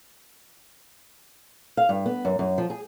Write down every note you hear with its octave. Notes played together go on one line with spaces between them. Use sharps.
F5
G2
B3
F#2
F#2
F3
G#4